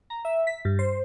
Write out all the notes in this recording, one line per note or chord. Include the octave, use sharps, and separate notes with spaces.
A#5
E5
B6
G2
C5